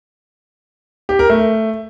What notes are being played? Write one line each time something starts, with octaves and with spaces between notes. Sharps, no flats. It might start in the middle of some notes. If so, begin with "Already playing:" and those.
G4
A#4
A3